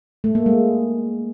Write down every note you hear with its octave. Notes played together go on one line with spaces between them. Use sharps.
A3
A#3
G#3